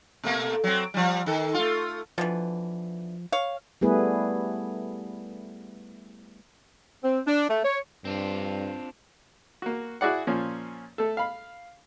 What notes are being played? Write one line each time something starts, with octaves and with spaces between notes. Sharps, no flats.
B2 A3 A#3
F#3 C4
F3 G3
D#3 A4
A3 F4
B2 D3 E3 F3
C#5 F5
G3 A3 B3 E4 G#4 B4
C4
D4
A3
C#5
G2 C4 D4 F4
A#3 F#4
E4 F#4 G#4 D5 F#5
A#2 F3 C#4
A3 A4
F5 B5